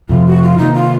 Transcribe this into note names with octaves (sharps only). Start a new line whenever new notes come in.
F2 C3 F3 F4
F#4
F4
C3 D#3 A#3 D#4
F4